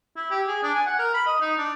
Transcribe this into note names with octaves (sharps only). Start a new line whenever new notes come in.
E4
G4
G#4
D4
G#5
F#5
A#4
B5
D#5
D#4
D4